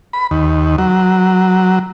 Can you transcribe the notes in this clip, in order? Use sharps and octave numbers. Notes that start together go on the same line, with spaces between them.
B5
D#2
F#3